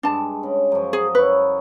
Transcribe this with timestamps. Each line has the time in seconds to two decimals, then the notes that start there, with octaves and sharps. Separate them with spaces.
0.03 G2 G#3 D4 A5
0.43 C#3
0.72 F#2 F3
0.93 G#4 D#5
1.15 F#2 E4 B4 C#5